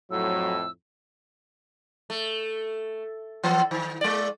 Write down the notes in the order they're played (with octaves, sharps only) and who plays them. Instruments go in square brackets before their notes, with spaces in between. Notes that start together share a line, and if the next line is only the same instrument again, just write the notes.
[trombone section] F2 A2 [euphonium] F#3 [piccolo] E6
[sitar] A3
E3 B3
D#3
G#3 D5